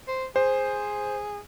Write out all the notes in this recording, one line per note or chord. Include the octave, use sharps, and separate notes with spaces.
C5
G#4 C5